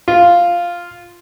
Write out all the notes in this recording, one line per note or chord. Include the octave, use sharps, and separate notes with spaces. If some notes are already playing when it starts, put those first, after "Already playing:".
F4